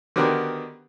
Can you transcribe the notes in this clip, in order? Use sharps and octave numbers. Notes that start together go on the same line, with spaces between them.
D3 D#3 B3 F#4 G4 A#4